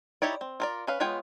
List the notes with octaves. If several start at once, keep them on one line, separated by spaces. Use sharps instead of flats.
D#4 E4 G4 C#5 D5
C4
F4 A#4 D5
C#4 B4 F5
G#3 B3 F4 C#5 G5